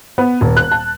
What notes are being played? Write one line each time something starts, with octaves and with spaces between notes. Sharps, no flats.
B3
D#1
F#6
A5